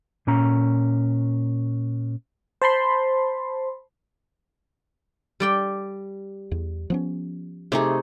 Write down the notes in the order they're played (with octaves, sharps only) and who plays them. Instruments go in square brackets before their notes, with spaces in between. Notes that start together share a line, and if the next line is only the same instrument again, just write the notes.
[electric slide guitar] A#2 C#4 A#5
[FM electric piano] C5 A5 B5 C6
[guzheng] G3 D5 G5
[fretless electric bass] E2
F3 B3 C#4
[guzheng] C3 [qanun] A3 D#4 G#4